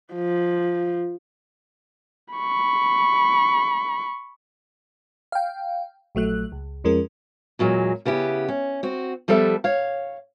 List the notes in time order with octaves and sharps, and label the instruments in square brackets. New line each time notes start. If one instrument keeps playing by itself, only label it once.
[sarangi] F3
[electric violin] B5 C#6
[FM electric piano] F5 G5
A#1 F#3 A3 F#6
C#2
F2 F3 G#3 C#4 A#4
[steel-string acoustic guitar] E2 A#2 F#3 G#3
C#3 B3 E4 G4
C#4
C4 F#4
F3 G3 B3 A4 E5 A5
C#5 F5